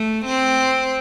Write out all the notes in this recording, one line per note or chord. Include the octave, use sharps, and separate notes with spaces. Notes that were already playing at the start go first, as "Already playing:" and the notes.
Already playing: A3
C4